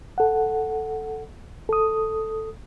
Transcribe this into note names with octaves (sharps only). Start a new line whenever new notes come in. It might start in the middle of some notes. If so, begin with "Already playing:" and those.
A4 F#5
A4 D#6